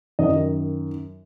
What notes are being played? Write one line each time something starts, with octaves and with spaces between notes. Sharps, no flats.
F#2 D#3 D#5